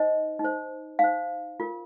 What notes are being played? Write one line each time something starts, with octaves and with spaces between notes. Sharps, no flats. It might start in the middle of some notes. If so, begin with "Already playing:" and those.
Already playing: D#4 C5 D#5
D#4
C5
D#4 C5 F5
F4 A#4